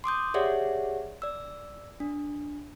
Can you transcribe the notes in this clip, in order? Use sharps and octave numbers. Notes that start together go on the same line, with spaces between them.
C6 D6 D#6 G6
G4 G#4 C#5 D5 E5 F#5
D5 E6
D4